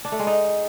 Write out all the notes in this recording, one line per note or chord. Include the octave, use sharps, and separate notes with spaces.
D4
A3
G#3
D#4